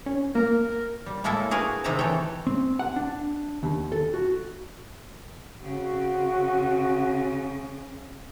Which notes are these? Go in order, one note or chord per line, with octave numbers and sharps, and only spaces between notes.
C#4
A#3 A#4
G3
A2 G#3 A#3 E4 A4 E5
F#4 G#4 A#4 B4
C3 D#3 C4 D#4 E5 A#5
E3 A4 C#5 G5
C4
F#5
D4
D#2
A4
F#4
C#3 C4 F#4